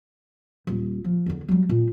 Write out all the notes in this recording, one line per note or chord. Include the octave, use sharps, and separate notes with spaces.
D#1
F3
E2 D3
F#3 G3
A#2